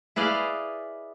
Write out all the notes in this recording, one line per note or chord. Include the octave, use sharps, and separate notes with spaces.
E4 G#4 B4 D5 D#5 F5